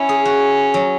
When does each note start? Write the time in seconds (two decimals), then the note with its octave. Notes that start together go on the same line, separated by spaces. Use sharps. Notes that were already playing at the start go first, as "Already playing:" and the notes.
Already playing: C#4 E4
0.09 G#4
0.25 F#4
0.74 F#3